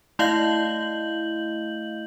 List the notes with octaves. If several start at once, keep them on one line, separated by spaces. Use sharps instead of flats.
A3 E4 D#5 F5 G6 F#7